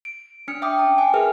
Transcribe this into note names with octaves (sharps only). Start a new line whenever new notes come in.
D7
C#4 D4 F6 C#7
E5 G5 D6 D#6
G5 A5
F#5 G#5
G#4 A#4 B4 E5 F6